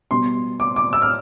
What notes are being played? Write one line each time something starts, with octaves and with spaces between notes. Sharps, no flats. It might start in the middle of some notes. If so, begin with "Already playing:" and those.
B2 G3 C6
D6
D6
E6
F6